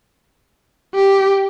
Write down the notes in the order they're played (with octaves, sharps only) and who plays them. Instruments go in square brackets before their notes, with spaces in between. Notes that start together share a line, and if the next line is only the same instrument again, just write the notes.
[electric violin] G4